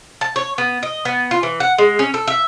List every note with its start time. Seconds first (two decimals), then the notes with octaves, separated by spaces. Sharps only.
0.21 A5
0.36 C#5
0.58 B3
0.83 D#5
1.05 B3
1.31 F4
1.43 E3
1.60 F#5
1.78 G#3
1.99 C#4
2.14 A4
2.28 E5